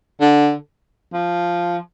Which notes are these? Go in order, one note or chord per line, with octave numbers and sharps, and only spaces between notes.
D3
F3